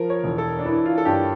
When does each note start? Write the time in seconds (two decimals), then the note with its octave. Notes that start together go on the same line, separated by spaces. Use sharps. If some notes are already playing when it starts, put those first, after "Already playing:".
Already playing: F3 A#4
0.10 C#5
0.24 E1
0.38 A4
0.59 D4
0.65 E3 E4
0.86 F4
0.98 A4
1.05 G2 G4